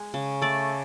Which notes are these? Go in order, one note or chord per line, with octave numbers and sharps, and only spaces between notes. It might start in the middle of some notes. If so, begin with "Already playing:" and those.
Already playing: G#3
C#3
A3 D5